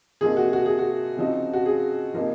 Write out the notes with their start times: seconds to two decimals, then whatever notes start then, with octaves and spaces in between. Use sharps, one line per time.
0.21 C3 F3 A#3 D#4 G#4
0.37 F#4
0.53 F#4
0.66 G#4
0.79 F#4
1.17 C#3 F3 C4 D#4
1.53 F#4
1.66 G#4
2.14 C3 F3 A#3 D#4